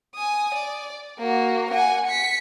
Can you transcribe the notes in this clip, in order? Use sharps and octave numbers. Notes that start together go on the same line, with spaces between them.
G#5 D#6
D5
A#3 F#4
F#5 G#5
B6 C#7